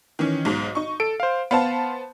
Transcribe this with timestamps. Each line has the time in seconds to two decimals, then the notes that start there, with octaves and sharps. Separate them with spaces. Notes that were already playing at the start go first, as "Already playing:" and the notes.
0.19 D#3 E3 C#4
0.45 B1 G#2
0.75 D#4 C#6
1.00 A4 D7
1.20 C5 F5
1.51 B3 C5 F5 A5 B5